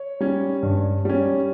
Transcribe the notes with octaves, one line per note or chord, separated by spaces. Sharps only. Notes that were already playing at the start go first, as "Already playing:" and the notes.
Already playing: C#5
G3 C#4
G2
G3 C#4